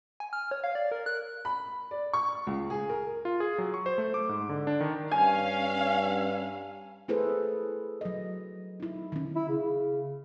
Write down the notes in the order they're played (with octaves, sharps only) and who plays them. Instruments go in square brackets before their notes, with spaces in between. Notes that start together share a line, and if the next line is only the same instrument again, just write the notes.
[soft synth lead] G#5
F6
C#5
F5
D5
A#4
F#6
[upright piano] B5
D5
C#6
C#2
G#4
A#4
[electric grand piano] F4
G#4
F#3
C#6
C5
A3
D6
G#2
D3
D4
D#3
[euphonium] G2 [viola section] C#4 F5 [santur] G#5
[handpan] A3 E4 G#4 A4 B4 C5
F#3 D#5
D#4 E4
D#3 C#4
[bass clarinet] E4
C#3